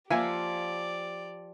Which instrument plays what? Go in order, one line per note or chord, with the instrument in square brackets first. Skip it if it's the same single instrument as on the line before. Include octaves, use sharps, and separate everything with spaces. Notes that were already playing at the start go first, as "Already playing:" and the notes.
[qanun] F3 [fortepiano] A#3 E5 G#5 [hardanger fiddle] G4 D5